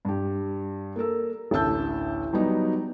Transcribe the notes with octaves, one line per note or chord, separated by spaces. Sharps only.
G2 G4
A#3 A4 A#4 E6
A1 D2 E3 A5 E6 G6
F#3 G3 B3 D#4